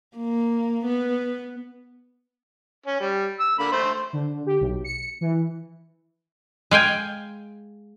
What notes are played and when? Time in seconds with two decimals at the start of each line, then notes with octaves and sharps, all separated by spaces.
0.17 A#3
0.86 B3
2.86 C#4
3.00 G3
3.40 E6
3.59 D3 A#3 B5
3.72 A3 C5
4.13 D3
4.46 G4
4.61 B1
4.84 C#7
5.21 E3
6.71 G#3 F5 G5 G#5